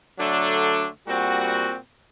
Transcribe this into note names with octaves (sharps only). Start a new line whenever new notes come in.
D3 F#3 A3 D4
A#2 G3 C4 F#4